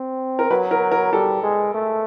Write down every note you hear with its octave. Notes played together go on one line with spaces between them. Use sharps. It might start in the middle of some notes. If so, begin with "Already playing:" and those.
Already playing: C4
A#4
F#3 B4
A#4
A#4
G3 A4
G#3
A3